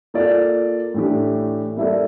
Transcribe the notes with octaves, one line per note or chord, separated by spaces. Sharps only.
A#3 F4 A4 D5
A2 E3 A3 D4 G4
G3 A#3 E4 A4 D5